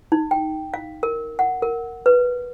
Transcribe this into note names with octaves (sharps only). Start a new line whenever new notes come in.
D#4
G5
F5
A#4
F#5
A#4
B4